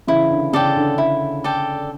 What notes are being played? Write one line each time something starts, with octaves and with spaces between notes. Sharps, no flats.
C#3 E3 E4
D3
C#3 A4 D5 G5
D3
E4
A4 D5 G5